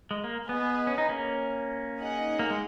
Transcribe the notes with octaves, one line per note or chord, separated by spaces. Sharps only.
G#3
A#3
B3 G#4 B4 D#5
C#4
D#4
A#3 C#4
D#4 G#4 D#5 F#5
A#3
G#3